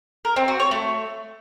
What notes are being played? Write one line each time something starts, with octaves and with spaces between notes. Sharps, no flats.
A#4
C4
F#4
C#5
A3